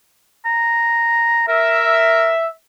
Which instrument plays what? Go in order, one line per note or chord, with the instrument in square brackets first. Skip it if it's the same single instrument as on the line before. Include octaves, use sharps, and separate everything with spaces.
[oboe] A#5
[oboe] A#4 [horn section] E5